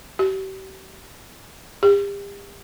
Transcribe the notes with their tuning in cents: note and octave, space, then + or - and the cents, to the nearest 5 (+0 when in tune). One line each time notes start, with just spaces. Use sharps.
G4 -40
G4 +40